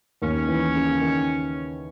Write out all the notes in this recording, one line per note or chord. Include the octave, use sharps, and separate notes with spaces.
D#2 C#4
E3
C#3
D#3